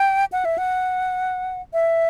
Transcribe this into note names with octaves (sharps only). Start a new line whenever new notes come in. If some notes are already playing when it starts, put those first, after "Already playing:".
Already playing: G5
F#5
E5
F#5
E5